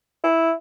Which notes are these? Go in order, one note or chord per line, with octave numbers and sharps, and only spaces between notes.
E4